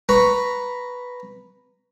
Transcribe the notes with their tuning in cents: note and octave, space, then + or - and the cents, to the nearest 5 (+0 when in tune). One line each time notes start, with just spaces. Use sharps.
B4 +0 A#5 +0 C#6 +0